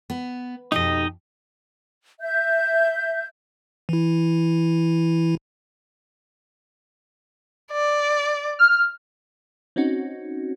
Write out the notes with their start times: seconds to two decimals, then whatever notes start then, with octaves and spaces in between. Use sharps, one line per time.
0.10 B3
0.72 F2 B2 D#4 G4 D#5
2.21 E5 G6
3.89 E3 E4
7.71 D5
8.59 F6
9.76 C4 C#4 D#4 F#4